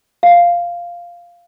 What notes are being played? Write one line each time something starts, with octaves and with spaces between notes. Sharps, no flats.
F5